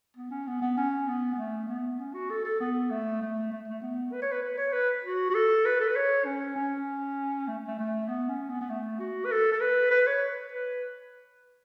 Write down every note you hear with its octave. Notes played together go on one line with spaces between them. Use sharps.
B3
C#4
B3
B3
C#4
B3
B3
A3
B3
C#4
F#4
A4
A4
B3
A3
A3
A3
A3
B3
B4
C#5
B4
B4
C#5
B4
F#4
F#4
A4
B4
A4
B4
C#5
C#4
C#4
A3
A3
A3
B3
C#4
B3
B3
A3
F#4
B4
A4
A4
B4
B4
C#5
B4